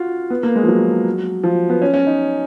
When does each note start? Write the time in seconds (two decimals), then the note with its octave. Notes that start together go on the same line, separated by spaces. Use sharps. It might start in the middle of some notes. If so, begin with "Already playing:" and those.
Already playing: F4 F#4
0.30 B3
0.43 A#3
0.56 G#3
0.63 F3
0.68 F#3
1.43 F3
1.70 B3
1.82 C#4
1.94 C#4
2.07 D#4